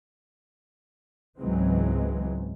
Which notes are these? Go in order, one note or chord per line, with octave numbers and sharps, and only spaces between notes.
C#2 G#2 E3 F#3 G#3 C4